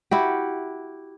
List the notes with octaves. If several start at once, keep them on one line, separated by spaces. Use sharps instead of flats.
E4 F#4 G4